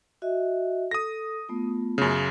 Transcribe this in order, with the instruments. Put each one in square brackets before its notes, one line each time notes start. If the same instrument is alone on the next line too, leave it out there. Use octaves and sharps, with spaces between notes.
[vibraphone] F#4 D#5 E5
[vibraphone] A4 [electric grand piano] D#6 A#6
[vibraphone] A3 B3 F4
[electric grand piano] F#2 C#3